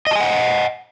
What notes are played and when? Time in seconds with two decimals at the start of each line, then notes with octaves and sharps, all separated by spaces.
0.07 D#5
0.11 A5
0.16 G#5
0.20 F#5